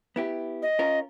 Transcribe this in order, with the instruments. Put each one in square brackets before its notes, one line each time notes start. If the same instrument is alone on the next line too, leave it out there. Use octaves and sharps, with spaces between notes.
[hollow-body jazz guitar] B3 E4 G4
[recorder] D#5
[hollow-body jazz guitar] C#4 F4 A#4